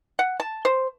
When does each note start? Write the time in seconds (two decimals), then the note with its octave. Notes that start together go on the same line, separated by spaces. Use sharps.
0.19 F#5
0.40 A5
0.65 C5